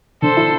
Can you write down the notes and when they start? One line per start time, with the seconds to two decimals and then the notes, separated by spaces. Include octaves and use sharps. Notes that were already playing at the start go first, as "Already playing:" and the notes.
0.22 D3 A4 C5
0.37 E4